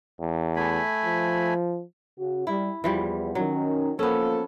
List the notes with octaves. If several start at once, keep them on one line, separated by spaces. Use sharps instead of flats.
E2
A3 G#5 B5
F3
C#3 F#4
G3 E4
E2 E3 F3 G3
D#3 F#3 C#4
F3 A#3 B3 C#4 A4